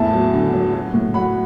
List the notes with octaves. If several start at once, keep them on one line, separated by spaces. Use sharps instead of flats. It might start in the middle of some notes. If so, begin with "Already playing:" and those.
Already playing: E2 A2 E5 A5
F#3
D3
F#3
F#3
A2
F#3 F#5 B5